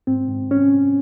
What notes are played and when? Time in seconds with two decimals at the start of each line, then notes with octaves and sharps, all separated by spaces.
0.07 G#2 C4
0.29 G#2
0.51 C#4